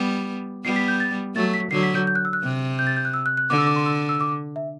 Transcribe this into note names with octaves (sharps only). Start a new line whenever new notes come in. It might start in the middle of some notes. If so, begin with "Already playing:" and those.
Already playing: G3 B3
G3 B3 C7
B6
G6
A6
F#3 A3 A6
B6
D3 F#3 C7
B6
G6
G6
F#6
E6
F#6
C3
G6
A6
G6
F#6
E6
F#6
F#6
D3 D6
E6
D6
C6
E6
E6
D6
E5